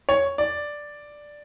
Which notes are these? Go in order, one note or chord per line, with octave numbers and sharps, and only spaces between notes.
C#5
D5